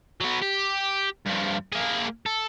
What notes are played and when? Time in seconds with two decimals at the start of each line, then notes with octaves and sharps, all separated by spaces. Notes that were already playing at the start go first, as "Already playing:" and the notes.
0.21 F#3 B3
0.42 G4
1.26 G2 F3
1.73 A#3 G#4
2.26 A4